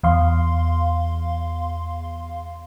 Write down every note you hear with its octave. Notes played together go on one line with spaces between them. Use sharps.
E2 F5 C6